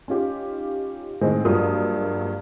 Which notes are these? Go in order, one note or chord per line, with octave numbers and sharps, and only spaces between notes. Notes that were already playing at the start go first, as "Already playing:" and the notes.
C#4 D#4 F4 G4
A2 D#3 G#3 C4
G2 F3 F#3 G#3 A#3 D#6